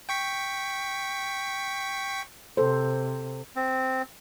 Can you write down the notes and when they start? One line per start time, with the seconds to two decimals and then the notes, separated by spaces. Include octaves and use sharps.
0.09 G5 C#6 B6
2.57 C3 A4 C5
3.56 C4